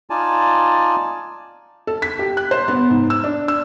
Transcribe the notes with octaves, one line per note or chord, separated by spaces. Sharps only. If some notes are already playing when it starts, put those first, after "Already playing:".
D#4 F4 D5 G#5 A5
A4
B6
G4
F#6
C5
B3
G#2
E6
D4
E6